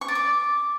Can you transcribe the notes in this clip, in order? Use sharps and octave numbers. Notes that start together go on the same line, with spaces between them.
C#6
D5
D6